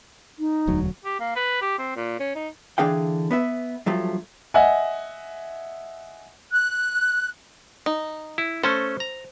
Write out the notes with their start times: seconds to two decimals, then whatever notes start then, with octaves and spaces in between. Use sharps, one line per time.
0.39 D#4
0.67 E1 D2 F#3
1.04 G4
1.20 A#3
1.36 B4
1.61 G4
1.78 C4
1.96 A#2
2.20 C#4
2.35 D#4
2.78 D3 E3 D4 G#4 F5 G5
3.31 B3 B4 E5
3.86 G2 F3 F#3 A3
4.54 D#5 E5 F#5 G#5
6.52 F#6
7.86 D#4
8.38 E4
8.63 A3 C#4 A4 C5
9.00 A#5